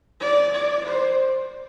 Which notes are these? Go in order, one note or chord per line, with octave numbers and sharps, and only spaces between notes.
D5
D5
C5